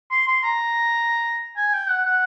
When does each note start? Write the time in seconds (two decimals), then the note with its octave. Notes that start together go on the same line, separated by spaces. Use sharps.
0.11 C6
0.27 C6
0.43 A#5
1.57 G#5
1.73 G5
1.89 F#5
2.05 F#5